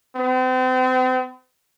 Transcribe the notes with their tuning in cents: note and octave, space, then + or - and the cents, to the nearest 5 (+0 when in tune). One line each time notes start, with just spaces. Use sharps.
C4 -40